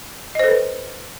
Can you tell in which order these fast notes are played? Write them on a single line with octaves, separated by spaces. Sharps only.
D#5 C5 A4 B4